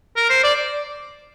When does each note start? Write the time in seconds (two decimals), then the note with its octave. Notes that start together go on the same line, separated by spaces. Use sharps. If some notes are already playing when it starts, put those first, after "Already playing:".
0.17 A#4
0.30 C5
0.43 D5